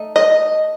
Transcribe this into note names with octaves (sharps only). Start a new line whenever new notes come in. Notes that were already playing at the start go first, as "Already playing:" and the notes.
Already playing: A3 D#4
D#5